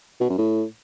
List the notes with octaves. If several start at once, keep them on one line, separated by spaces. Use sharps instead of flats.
B2
F#2
A2